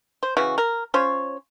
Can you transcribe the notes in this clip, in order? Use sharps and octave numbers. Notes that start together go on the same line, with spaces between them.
C5
C#3 E3 F#4
A#4
C#4 F4 C5 C#5